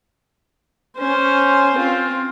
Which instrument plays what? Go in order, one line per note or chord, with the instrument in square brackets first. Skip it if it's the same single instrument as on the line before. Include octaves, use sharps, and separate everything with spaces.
[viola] C#4 C5
C4 F4